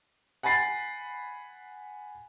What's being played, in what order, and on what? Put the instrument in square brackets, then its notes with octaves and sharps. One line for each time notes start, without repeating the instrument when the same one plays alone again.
[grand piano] F#5 G#5 B5 A6 C7